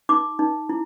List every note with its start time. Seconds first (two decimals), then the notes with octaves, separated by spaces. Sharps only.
0.09 D#4 D6
0.39 D#4
0.69 E4